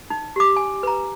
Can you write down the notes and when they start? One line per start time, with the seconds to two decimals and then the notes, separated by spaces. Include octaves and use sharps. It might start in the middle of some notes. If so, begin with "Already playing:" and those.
0.10 D#4
0.36 G4 D6
0.56 G#5
0.83 B4 A#5